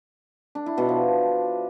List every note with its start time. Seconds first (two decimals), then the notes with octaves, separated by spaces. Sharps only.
0.55 D4
0.66 E4
0.78 B2
0.89 F3